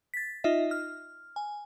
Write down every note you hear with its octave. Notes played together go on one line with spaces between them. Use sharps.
A6 B6
D#4 F4 D#5 E5
F6
G#5